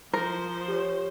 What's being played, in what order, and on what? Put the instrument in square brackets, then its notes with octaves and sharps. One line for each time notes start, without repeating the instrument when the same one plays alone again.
[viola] F3 C5 [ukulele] A#4
[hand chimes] G4 C#5